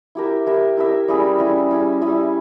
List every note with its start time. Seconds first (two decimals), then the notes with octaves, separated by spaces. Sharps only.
0.15 E4 G4 A#4 E5
0.46 E4 G4 A#4 E5
0.77 E4 G4 A#4 E5
1.08 G3 C#4 E4 G#4
1.39 G3 C#4 E4 G#4
1.71 G3 C#4 E4 G#4
2.01 G3 C#4 E4 G#4